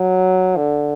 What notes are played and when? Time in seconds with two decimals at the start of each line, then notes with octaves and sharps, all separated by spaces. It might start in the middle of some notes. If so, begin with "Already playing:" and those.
Already playing: F#3
0.56 D3